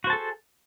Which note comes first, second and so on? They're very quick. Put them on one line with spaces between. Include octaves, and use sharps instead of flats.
F#4 C5 A5 A4 G#4